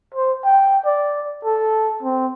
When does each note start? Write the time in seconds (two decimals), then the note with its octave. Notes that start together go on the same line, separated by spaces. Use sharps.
0.14 C5
0.44 G5
0.86 D5
1.45 A4
2.03 C4